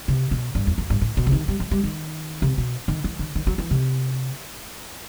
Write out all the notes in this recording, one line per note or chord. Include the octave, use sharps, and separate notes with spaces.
C3
B2
G2
E2
F#2
G2
A2
B2
C3
D#3
G3
F#3
G3
D#3
C3
B2
D#3
E3
D#3
D#3
F#3
E3
C3